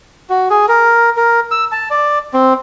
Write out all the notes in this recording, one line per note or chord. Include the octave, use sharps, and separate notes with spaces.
F#4
G#4
A#4
A#4
E6
A5
D5
C4